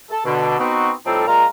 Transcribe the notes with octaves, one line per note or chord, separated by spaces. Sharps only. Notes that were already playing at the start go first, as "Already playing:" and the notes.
A4
B2 D3
B3 C4 D#4 F#4
A2 F3 G3 C4 D#4 A4
A#2 G#3 F4 F5 A#5